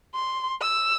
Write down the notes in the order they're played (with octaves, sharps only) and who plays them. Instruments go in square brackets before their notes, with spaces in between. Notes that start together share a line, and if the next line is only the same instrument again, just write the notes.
[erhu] C6
E6